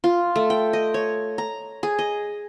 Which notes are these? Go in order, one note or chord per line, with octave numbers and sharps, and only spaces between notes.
F4
A3
G5
D#5
C#5
A#5
G#4
D#5